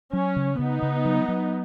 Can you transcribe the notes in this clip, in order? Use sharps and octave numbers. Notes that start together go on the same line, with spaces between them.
F#3 C#4
C#3
C#3 B3 D#4
C#3
F#3
F#3